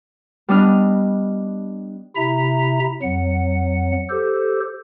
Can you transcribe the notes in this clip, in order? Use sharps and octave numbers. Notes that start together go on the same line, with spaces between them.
G3 B3 D4 D#5 F6
C3 E4 E5 A#5
F2 F#3 F#5
G4 A4 C5